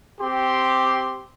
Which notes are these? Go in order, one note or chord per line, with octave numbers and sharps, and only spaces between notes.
C4 G4 C6